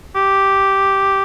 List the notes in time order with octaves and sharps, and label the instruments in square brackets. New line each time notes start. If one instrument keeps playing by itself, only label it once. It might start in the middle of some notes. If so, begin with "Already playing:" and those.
[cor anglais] G4